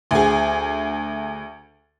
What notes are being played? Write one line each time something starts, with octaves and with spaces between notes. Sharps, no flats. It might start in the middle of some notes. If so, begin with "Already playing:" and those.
D2 G#4